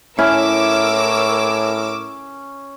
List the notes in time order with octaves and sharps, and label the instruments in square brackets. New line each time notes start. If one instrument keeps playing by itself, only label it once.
[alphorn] A2 [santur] C#4 [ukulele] E4 [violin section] A#4 D6 E6